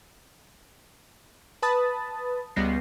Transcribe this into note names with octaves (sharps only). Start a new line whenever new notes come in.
B4 A5 B5 D#6 A6
C#2 G3 B3 A#6 C7